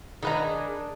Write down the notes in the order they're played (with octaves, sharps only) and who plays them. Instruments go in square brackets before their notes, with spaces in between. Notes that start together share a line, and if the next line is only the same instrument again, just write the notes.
[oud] D#3 [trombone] D4 [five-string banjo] D#4 B4 A#5 [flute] G#4